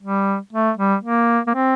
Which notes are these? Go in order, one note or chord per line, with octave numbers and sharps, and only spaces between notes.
G3
A3
G3
A#3
A#3
C4